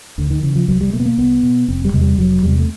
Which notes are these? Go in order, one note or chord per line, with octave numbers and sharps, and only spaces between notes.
D2 D3
D#3
C#3 E3
F3
C2 F#3
G3
B2 A3
B3
A#3
C2 B3
B2
F1 C4
G3
E2 C3 G#3
G3
F1 F#3
E2 C3 G3
A3